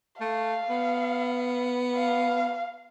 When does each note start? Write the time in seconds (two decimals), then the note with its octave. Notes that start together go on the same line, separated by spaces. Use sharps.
0.21 A3 F5
0.69 B3
1.96 F5